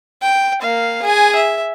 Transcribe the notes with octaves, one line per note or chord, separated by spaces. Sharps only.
G5
A#3 F5
G#4 G#5
E5